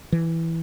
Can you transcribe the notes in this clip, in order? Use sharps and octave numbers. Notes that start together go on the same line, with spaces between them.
E3